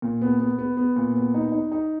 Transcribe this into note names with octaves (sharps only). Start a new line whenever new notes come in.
A#2
B3
B3
B3
B3
A#2
B3
D#4
D#4
D#4